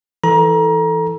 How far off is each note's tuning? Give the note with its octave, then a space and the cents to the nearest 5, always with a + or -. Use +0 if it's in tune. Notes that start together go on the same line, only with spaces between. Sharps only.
E3 +0 A4 +10 A#5 +25